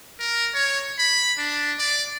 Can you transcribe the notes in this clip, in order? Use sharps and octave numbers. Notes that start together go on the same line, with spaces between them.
A#4
C#5
B5
D4
D5